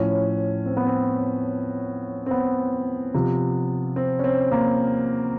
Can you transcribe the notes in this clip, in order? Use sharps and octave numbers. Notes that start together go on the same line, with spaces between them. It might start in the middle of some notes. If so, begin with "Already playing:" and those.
Already playing: A2 F3 C#4
C4
B3
C4
C4
B3
C3 F3
C4
C#4
C4
A#3